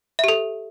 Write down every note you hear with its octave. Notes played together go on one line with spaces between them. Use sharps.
G4 A4 E5